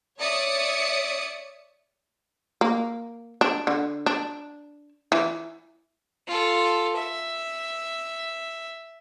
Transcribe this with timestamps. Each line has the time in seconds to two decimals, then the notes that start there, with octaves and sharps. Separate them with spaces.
0.19 C#5 D5 E5 D#6 C#7
2.61 A#3
3.41 D4
3.67 D3
4.06 D4
5.12 E3
6.27 F4 A4
6.96 E5